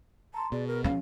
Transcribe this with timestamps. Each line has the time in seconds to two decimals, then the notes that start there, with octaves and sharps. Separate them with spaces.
0.34 A5 A#5 C6
0.52 B2 G#4 D5
0.67 A#4
0.84 F3 C#4 F5